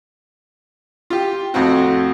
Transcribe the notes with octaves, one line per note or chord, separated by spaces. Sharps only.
F4 G4
F2 A2 C4 F#4